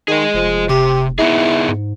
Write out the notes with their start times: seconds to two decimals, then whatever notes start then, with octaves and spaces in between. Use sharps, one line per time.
0.08 D#3 G#4 D#5
0.34 F1 F3
0.69 C3 G4
1.19 B3 D#4 E4 G#4
1.68 G#2